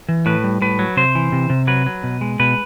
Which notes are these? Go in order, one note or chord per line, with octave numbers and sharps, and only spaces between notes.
E3
A2 B4
G3
A2 B4
F#3
C3 C5
E3
C3
C3
F#3 B4
F#3
B2
G#3
B2 B4